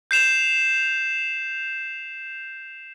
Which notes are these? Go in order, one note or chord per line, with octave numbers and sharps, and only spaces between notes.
G6 C7 E7 F7